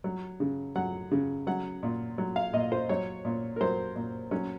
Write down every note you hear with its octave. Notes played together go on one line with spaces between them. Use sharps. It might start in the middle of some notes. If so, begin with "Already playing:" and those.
F#3
C#3
F#3 F#5
C#3
F#3 F#5
A#2
F#3
F5
A#2 D#5
C5
F#3 C#5
A#2
A#4
F#3 C5
A#2
F#3 C#4